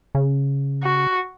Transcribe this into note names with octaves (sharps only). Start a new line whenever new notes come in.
C#3
F#4